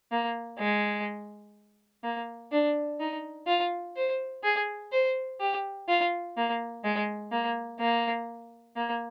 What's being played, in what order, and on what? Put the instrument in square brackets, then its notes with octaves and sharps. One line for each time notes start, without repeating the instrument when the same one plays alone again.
[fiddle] A#3
G#3
A#3
D4
D#4
F4
C5
G#4
C5
G4
F4
A#3
G#3
A#3
A#3
A#3